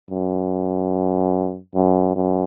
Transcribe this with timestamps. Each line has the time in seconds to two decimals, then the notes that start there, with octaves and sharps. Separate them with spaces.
0.10 F#2
1.75 F#2
2.16 F#2